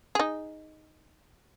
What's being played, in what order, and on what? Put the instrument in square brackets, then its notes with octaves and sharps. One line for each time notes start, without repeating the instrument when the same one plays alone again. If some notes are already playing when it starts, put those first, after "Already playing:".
[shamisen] D#4 G#4